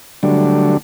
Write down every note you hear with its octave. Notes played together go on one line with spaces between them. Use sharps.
D3 F#3 G3 A3 D4